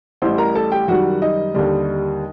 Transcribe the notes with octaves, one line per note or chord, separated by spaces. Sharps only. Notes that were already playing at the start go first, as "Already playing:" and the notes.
A1 A2 G3 C5 C6
A#4 A#5
A4 A5
G4 G5
F#2 D#3 G3 F#4 F#5
D#4 D#5
D#2 D3 G3